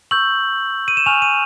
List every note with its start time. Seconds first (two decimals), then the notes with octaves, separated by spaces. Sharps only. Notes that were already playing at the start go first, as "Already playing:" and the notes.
0.11 C#6 E6 G6 F#7
0.88 D#7
0.97 E7
1.06 G#5 C#6 F6 F7
1.22 D#7